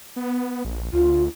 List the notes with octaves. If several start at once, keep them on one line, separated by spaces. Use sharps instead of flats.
B3
A#1
D2 F4